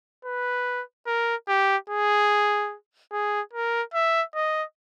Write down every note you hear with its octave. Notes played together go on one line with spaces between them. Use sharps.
B4
A#4
G4
G#4
G#4
A#4
E5
D#5